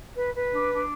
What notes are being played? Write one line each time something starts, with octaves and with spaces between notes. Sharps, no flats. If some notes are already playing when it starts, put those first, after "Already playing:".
B4
B4
D4
D4